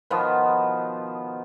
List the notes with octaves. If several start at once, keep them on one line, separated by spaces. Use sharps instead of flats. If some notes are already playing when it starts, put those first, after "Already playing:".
B2 D#3 F3 B3